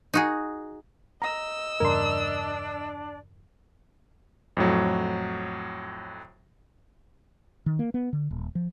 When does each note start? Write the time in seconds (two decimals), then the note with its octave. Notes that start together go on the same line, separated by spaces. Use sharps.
0.14 D#4 F#4 G#4
1.22 D#5 A#5 E6
1.80 E2 G2 C#3 D4 A#4 D5 C6
4.57 F2 A2 F#3
7.66 D#3
7.79 A#3
7.94 B3
8.13 D3
8.31 D#1
8.55 F3